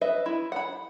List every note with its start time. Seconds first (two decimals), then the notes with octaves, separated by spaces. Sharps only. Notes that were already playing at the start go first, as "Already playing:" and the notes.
0.01 B4 D#5 E5
0.26 E4
0.52 F#5 B5